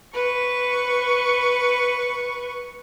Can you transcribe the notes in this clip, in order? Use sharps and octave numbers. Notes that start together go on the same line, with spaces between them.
B4 C#6